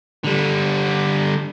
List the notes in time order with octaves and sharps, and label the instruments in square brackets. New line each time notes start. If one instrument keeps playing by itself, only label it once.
[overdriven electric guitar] D3 G3